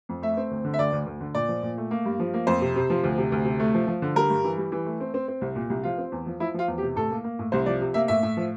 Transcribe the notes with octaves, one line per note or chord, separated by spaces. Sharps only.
F2
A3 E5
C4
D2
D3
E5
D2 D5
D2
D2
D3
A#2 D5
F3
A#2
A3
A#3
G2
F3
A#3
F2 C5
C3
C3
F3
D2
C3
D2
C3
A3
F3
F3
D3
G3 A#4
G2
E3
G3
E3
A3
C4
C4
C4
C2
A#2
C2
F3 F4
C4
E2
F3
F3 E4
F3 F4
E2
G4
C3
A2 A4
A#3
A#3
A2
C2 C5
F3 D5
C3
A#3 E5
A2 E5
A2
F3